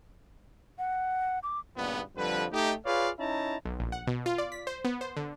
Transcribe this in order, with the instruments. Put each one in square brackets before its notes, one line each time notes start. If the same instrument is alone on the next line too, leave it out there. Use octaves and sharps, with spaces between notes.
[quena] F#5
D6
[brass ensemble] G#1 C#2 G2 A#2 B3
F2 D3 F3 G3 B4
A3 D#4 G4
F4 G#4 B4 C#5 D5 F5
C#4 D#4 E4 E5 A5 A#5
[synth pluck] B1
A#1
F#5
B2
F4
D5
B6
C5
B3
C5
D3